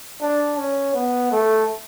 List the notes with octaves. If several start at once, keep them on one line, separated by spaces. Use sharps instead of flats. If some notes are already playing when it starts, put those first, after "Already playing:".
D4
C#4
B3
A3